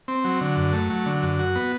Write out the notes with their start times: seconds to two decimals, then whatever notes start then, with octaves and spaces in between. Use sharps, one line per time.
0.08 C4
0.24 F#3
0.41 D3
0.57 F#2
0.73 A3
0.90 F#3
1.06 D3
1.23 F#2
1.39 F#4
1.56 B3